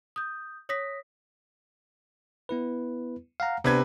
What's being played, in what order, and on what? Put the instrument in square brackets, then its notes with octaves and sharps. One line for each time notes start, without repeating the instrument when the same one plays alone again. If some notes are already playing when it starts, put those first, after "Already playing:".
[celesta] D#6 G6
C#5 D#6 A#6 B6
[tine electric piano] B3 E4 B4
F5 F#5 A#5
[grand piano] C3 B4 G#6 [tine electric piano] B3 D4